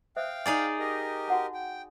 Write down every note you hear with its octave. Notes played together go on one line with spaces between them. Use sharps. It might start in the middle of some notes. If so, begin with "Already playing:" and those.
C5 E5 F5 G5 D#6
D#4 G#4 D5 G#5
G4 A#4 D#5
F#4 F#5 A5
G5